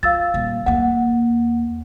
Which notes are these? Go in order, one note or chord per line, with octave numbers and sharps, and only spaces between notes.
F4 F5 E6 A6
D#1
D#2 A#3 F#5